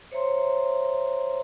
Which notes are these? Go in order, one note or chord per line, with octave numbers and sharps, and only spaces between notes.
C5 C#5 E5 A#5 C6